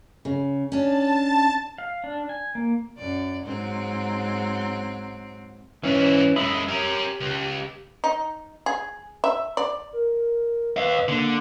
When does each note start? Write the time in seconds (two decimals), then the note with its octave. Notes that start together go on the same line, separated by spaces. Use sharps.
0.25 C#3
0.72 C#4 D4 A5 A6
1.78 F5
2.04 D4
2.29 G#5
2.55 A#3
2.97 F#2 D5
3.44 G#2 F#3 C4
5.84 G#2 E3 C#4 E4
6.36 F#2 G#3 D#5 E5 B5
6.68 C#4 G4 A#4
7.20 C#2
8.04 D#4
8.66 G#4
9.24 E5
9.57 D5
9.93 A#4
10.77 B4 D#5 F5
11.08 D3 A#3